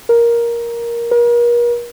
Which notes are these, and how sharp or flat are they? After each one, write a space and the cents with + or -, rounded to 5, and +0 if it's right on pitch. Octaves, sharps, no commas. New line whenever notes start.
A#4 +10
A#4 +40